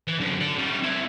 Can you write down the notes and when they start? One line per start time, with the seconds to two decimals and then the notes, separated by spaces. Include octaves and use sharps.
0.07 E3
0.20 F#2 D3
0.41 A4 D5
0.58 G3 C#4
0.83 C4 E4